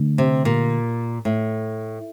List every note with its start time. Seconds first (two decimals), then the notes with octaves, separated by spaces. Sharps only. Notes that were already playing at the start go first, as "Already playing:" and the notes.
Already playing: D3 A3 D4
0.18 C3
0.45 A#2
1.25 A2